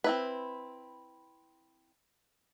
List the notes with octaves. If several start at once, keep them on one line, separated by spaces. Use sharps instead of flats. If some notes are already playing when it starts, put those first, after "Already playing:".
C4 E4 B4